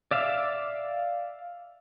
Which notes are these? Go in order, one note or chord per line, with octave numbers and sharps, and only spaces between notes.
D5 E5 F5 D6